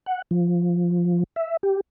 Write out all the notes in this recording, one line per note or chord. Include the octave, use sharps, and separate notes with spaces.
F#5
F3
E5
G4